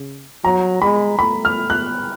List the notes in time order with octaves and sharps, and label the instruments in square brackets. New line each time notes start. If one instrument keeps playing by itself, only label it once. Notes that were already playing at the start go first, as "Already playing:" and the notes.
Already playing: [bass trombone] C#3
[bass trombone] F#3 [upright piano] A#5
[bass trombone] G#3 [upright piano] B5
[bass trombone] A3 [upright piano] B5
[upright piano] F6
F#6